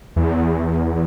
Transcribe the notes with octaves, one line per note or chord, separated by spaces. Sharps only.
E2